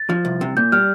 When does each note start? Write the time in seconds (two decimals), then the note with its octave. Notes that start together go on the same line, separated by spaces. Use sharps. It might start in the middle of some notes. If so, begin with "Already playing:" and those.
Already playing: A6
0.10 F3
0.25 C2
0.41 C3
0.57 A#2 G6
0.72 G3 F6